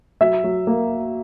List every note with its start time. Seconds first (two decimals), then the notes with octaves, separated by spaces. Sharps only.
0.21 F#3 E5
0.44 F#3
0.67 A#3